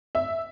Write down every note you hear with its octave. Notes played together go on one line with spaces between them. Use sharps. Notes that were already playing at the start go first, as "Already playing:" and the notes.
E5